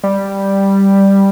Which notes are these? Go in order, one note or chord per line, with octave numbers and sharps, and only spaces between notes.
G3